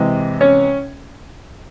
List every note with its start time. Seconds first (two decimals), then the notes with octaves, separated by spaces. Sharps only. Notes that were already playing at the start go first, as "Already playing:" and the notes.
Already playing: C3 E3 G#3
0.41 C#4 C#5